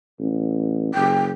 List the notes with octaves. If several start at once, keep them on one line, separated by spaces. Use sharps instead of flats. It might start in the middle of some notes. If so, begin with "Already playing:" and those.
A1
F#1 G5